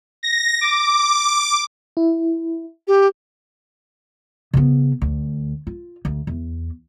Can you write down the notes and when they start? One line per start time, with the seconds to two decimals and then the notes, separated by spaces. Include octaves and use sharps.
0.23 A#6
0.61 D6
1.97 E4
2.87 G4
4.54 C#3 B3
5.02 D2
5.67 F4
6.05 D2
6.27 E2